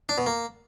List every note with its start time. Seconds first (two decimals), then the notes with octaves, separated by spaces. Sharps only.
0.09 D4
0.18 B2
0.26 A#3